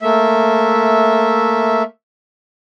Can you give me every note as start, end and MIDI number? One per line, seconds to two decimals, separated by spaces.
0.01 1.83 57
0.01 1.83 58
0.01 1.83 76